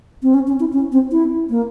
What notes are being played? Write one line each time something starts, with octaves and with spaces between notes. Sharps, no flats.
C4
C#4
C#4
E4
C#4
C4
E4
A#3